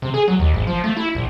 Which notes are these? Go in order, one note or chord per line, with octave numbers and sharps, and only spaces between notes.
C3
G#4
F#3
D#2
G#1
F3
A3
E4
A#1